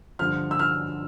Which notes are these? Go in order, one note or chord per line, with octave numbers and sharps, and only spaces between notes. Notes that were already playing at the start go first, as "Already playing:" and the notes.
G2 D3 F3 F6
E6
F6